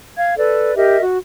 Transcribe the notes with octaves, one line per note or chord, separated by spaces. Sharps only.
F5 G#6
A4 B4 D5
G4 A#4 D#5 E5
F#4